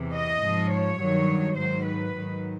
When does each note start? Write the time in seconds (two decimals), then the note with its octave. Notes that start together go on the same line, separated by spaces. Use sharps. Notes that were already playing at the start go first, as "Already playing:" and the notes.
Already playing: E2 C3 E3
0.13 D#5
0.41 G#2 F3
0.71 C#5
1.00 G2 D#3 F#3
1.56 G#2 D#3 F#3 C5
1.86 B4
2.14 G#2 D#3 F#3